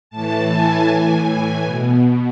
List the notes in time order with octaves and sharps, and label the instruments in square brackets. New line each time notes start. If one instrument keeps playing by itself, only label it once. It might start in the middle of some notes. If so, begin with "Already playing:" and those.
[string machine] A2 E3 A5
G#5
A2 E3
B2